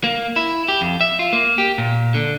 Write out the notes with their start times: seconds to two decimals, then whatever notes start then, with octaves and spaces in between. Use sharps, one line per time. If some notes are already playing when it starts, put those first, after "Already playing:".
0.04 A#3
0.36 E4
0.68 G4
0.81 F2
1.01 E5
1.19 F4
1.33 A#3
1.58 G4
1.78 A#2
2.14 D3